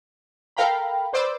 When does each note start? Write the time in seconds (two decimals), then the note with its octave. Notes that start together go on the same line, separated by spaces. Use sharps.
0.57 A4 A#4 F5 G5 A#5 B5
1.13 B4 C5 D5 D6 E6